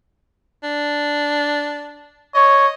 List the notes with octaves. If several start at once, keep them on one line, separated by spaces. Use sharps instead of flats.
D4
C#5 D#5